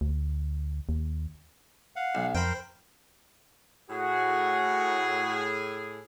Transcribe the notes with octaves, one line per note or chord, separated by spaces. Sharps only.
D2
D#2
F5 F#5
B1
F2 A#4 C5 G5 B5
A2 F#4 G#4